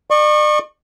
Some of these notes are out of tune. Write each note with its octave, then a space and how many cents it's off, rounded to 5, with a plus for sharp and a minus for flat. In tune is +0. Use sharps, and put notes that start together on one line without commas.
D5 +40 C#6 -20